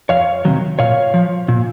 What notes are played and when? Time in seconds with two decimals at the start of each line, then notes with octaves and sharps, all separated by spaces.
0.09 F2 C#5 F5
0.45 C3 D#3 F#3
0.79 A#2 C#5 F5
1.14 F3
1.48 A#2